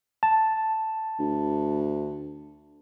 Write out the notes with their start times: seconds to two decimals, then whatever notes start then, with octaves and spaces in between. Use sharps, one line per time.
0.23 A5
1.19 D2